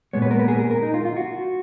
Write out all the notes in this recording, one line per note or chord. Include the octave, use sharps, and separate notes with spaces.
A#2 G#3 B3 C#5
B4
A#4
B4
G#4
A#4
A#4
D#4
F4
F4
F#4